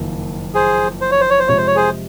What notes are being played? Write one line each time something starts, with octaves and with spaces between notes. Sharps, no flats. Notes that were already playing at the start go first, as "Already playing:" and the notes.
Already playing: F#1 F2 D#3 A#3
G#4 C5
C5
C#5
C5
C#5
C5
F2 C3 F3 G#3 C#5
C5
C#5
G#4 C5